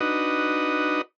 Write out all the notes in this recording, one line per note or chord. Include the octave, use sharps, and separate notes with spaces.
D4 D#4 F#4 B4 D#5